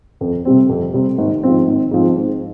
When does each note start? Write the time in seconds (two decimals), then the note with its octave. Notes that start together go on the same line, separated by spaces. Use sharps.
0.21 F2
0.45 C3 G3 C4
0.69 F2
0.93 C3 G3 C4
1.18 G#1
1.43 G#2 F3 C4
1.67 G#1
1.91 G#2 F3 C4
2.17 G#2